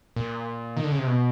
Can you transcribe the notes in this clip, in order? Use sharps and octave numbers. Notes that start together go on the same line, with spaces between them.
A#2
D#3
D3
C#3
C3
B2